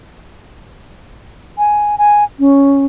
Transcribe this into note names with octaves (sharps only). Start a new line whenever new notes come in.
G#5
G#5
C#4